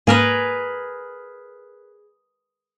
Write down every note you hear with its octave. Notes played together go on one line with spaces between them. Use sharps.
G#2 A#3 G#4 A#4 B4 E7